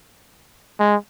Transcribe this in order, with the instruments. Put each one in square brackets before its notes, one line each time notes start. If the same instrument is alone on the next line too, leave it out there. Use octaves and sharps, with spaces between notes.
[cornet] G#3